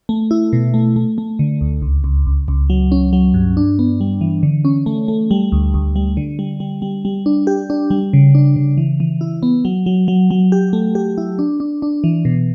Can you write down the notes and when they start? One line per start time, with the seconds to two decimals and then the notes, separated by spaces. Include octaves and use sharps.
0.09 A3
0.31 E4
0.53 B2
0.74 A3
0.96 A3
1.18 A3
1.39 D3
1.61 D2
1.82 C#2
2.04 C#2
2.27 C#2
2.48 C#2
2.70 F#3
2.92 C#4
3.13 F#3
3.34 G2
3.57 D4
3.79 B3
4.01 G3
4.21 E3
4.43 D3
4.65 C#4
4.86 A3
5.08 A3
5.31 G3
5.52 D2
5.74 D2
5.96 G3
6.17 D3
6.39 G3
6.60 G3
6.82 G3
7.05 G3
7.26 D4
7.47 G4
7.70 D4
7.90 G3
8.13 C#3
8.35 D4
8.56 C#3
8.77 E3
9.00 E3
9.21 E4
9.43 B3
9.65 F#3
9.86 F#3
10.08 F#3
10.31 F#3
10.52 G4
10.73 A3
10.95 G4
11.18 E4
11.39 D4
11.60 D4
11.82 D4
12.04 E3
12.25 B2